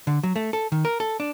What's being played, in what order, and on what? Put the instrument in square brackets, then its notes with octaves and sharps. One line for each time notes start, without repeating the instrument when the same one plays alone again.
[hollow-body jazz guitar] D3
F#3
A3
A4
D#3
A#4
A4
D4